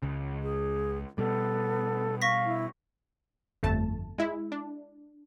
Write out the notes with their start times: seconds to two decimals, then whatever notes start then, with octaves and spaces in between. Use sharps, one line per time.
0.02 C#2 C#3
0.42 G#4
1.18 B2 G3 B3 A4
2.22 F5 C#6 A#6 B6
2.45 E4
3.63 G1 F2 A3 A5
4.18 G#3 E4
4.52 D4